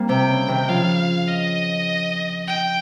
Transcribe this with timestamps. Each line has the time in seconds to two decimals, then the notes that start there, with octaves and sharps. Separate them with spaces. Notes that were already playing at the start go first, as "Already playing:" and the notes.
Already playing: G3 A#3 C4
0.09 C3 G5
0.28 C#3
0.48 C3 D#3
0.68 C#3 F3 F5
1.28 D#5
2.47 G5